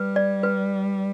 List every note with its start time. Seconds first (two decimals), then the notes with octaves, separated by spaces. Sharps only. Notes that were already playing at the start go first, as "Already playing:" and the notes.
Already playing: G3 B4
0.16 D5
0.43 B4